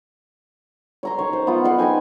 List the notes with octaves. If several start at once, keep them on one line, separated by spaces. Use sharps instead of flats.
C#5 A#5 C6
D#3 C#5
C5
B3 F4
D#4 F#5 C6
D#4 A#4 G5 G#5